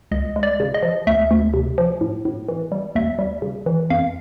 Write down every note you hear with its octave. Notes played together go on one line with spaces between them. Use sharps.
C#2 D#5
G#3
D5
C#3
D#5
F3
D2 E5
D2
C3
F3
A2
A2
E3
G3
D#2 E5
G3
C#3
E3
F2 F5